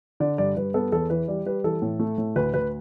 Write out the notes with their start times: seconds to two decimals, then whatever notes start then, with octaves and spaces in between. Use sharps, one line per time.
0.20 D3 D5
0.38 G2 D5
0.56 G2 B4
0.74 B3 A4
0.92 E2 A4
1.10 E3 B4
1.28 G3 D5
1.46 G3 B4
1.64 E3 A4
1.82 A2
1.99 A3
2.18 A2
2.36 D2 B4
2.54 D2 B4